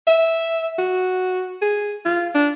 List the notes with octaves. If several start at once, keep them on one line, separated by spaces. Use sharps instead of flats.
E5
F#4
G#4
F4
D4